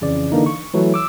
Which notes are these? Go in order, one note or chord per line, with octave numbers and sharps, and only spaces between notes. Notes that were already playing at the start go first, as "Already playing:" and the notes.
F2 C#3 E3 D5
D3 E3 A#3 D4 D#4
C#6
E3 F#3 A3
D6 E6